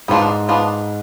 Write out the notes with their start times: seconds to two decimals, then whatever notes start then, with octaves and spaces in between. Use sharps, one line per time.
0.08 G#2 B3 D4 F4
0.49 B3 D4 F4